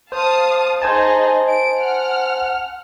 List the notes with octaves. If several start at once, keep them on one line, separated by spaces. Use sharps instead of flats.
C5 F5 A5 D#6
D#4 G#4 C5 D#5 G#5 A5
D7
F#5 F6